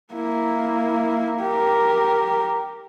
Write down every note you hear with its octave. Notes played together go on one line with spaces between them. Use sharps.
A#3 E4
G4 A#4